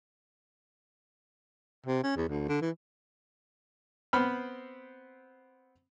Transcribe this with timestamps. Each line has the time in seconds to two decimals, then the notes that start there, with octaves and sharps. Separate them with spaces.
1.86 C3
2.03 C#4
2.16 E2
2.29 D2
2.48 D3
2.61 E3
4.13 B3 C4 C5 B5 F6